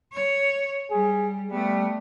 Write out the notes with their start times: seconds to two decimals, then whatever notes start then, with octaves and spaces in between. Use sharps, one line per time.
0.13 C#5
0.91 G3 G#4
1.51 G3 A3 B3